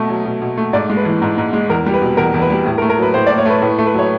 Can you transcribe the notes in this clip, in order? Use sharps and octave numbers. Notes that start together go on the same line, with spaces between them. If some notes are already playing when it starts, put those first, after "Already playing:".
Already playing: B2 A3
F#3
B2
B2
A3
G#2 D5
G#3
B4
E3
G#2
G#2
G#3
E2 A#4
G3
B4
B2
E2 A#4
E2
B4
G3
A2
A#4
A3
A#4
F#3 B4
A2 C5
D5
A2
C#5
A3 B4
A2 B4
A3
B4
F#3 C#5